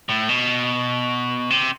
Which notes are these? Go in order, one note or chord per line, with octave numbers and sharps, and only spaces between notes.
A2
B2
C3